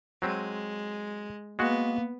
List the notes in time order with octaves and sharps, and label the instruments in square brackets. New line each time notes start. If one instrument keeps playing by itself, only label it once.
[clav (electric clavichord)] F#3 C4 [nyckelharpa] G#3
[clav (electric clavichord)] G#3 F#4 [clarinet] A#3 [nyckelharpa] B3